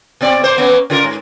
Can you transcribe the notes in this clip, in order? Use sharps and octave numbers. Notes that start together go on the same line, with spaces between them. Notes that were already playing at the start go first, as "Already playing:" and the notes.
B2 C4 D5
A#3 C5
A#3 B3 C#4
C#3 F4 A#4
G#2